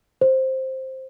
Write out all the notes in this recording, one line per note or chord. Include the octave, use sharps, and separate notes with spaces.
C5